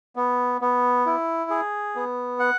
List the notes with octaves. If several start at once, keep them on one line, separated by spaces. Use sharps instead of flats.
B3
B3
E4
G#4
B3
F#5